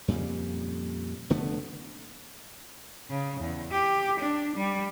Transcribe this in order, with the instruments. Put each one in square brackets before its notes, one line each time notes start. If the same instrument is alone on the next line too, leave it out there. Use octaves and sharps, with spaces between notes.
[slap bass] F2 A#2 C#3 G3
F1 D3 A3 B3
[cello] C#3
E2
G4
D4
G3